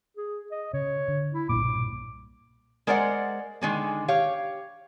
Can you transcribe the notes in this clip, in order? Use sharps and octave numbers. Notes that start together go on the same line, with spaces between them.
G#4
D#5
C#3 C#5
D3
E4
B1 G2 A#2 D6
G#3 A#4 C5 D5 E5 F#5
D3 D#3 G#3 A#3
G4 C#5 F5